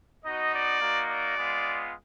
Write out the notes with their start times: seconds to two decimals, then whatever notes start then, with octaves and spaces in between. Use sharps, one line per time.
0.24 B3 D#4 F#4 D#5
0.53 D5
0.81 A#3 D#4 F#4
1.09 D5
1.37 G#3 B3 F4